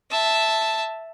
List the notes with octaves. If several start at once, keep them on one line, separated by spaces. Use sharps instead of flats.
E5 A5